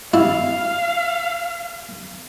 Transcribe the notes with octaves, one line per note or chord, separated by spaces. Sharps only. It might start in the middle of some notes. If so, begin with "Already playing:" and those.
E4 F5